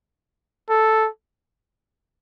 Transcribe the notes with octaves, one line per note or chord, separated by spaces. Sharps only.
A4